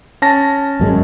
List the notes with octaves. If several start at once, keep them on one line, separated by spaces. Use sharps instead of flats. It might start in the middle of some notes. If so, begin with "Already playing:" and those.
C#4 A5 A#6
G#1 F#2 G#3